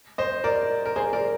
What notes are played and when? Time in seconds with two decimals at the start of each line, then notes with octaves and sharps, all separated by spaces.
0.18 C5 D#5
0.44 A#4 D5
0.86 A#4
0.96 G#4 C5
1.13 A#4 D5